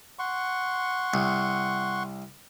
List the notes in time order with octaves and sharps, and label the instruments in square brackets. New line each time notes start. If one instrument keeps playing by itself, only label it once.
[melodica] F#5 C6 C#6
[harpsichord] C2